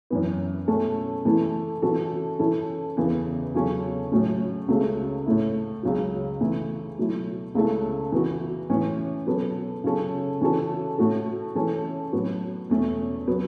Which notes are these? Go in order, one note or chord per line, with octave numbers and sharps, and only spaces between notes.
F#2 E3 B3
B2 A3 C#4 A4
E3 A3 E4 A4
E3 C#4 F#4 A4
E3 C#4 E4 A4
E2 C#3 E3 B3
E2 C#3 F#3 C#4 A4
A2 F#3 A3 C#4
C#2 C#3 A3 F#4 A4
A2 A3 E4
C#2 C#3 F#3
E3 A3 E4
B2 F#3 A3 E4
C#2 C#3 A3 E4 A4
E3 B3 F#4
A2 E3 C#4
B2 F#3 B3 A4
C#3 F#3 C#4 A4
E3 C#4 F#4 A4
A2 A3 F#4 A4
E3 A3 C#4 A4
A2 F#3 B3 F#4
E2 B2 A3 C#4
F#3 B3